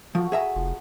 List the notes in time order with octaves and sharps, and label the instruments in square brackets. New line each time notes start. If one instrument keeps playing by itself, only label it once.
[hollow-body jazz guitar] F3 [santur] A3 F#4
[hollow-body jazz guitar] G#4 E5 A#5
[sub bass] F1 [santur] F3